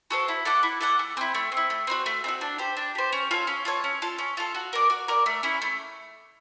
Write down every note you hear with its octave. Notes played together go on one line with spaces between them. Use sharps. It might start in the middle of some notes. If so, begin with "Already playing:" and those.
F#4 A4 C5
E4
A4 D5 F#5
E4
A4 D5 F#5
A3
C4 E4
A3
C4 E4
A3
C4 D#4 F#4
A3
C4 D#4 F#4
D4
G4 C5
D4
G4 C5
C#4
F4 A4 C#5
C#4
F4 A4 C#5
C#4
F4 A4
C#4
F4 A4
F#4
A#4 D5
F#4
A#4 D5
A3
C#4 E4
A3